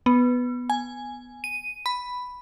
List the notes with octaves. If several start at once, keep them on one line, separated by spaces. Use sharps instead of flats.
B3
G#5
D#7
B5